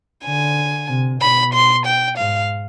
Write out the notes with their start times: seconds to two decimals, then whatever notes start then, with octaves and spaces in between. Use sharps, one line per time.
0.24 D3 G#5
0.89 C3
1.21 B2 B5
1.53 C6
1.86 G5
2.18 G#2 F5